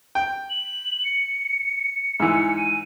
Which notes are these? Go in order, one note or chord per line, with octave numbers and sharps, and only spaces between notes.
G5
F#7
C#7
G#2 E3
D#7